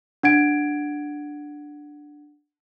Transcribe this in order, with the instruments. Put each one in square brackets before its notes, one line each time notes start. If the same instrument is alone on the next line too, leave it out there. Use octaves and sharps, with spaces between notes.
[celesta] D4 F#5 G#6 D7